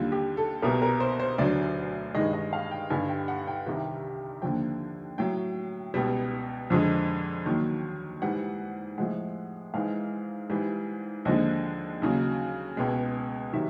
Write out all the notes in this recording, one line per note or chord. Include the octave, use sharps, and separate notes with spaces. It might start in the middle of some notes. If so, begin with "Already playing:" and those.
Already playing: D#2 D3 G3 F4
G4
A4
C2 B2 G3 A#4
A#4
C5
C5
D2 D3 F#3 D5
G2 D#3 G#3 D#5
D#5
F5
G5
G2 D3 G3 G#5
G5
F#5
G5
C2 C3 D#3 G3
D#2 D3 F3 G5
A2 F#3 G5
C#2 B2 G3
F2 D3 F3 G#3
D#2 D#3 F#3
G#2 E3 G3 F#5
A2 F3 G#3 F#5
G#2 E3 G#3 F5
G#2 E3 G3
D#2 D3 F3 G#3 D#5
D#2 C#3 F#3
C#2 B2 G#3
C3 D#3 F#3 E5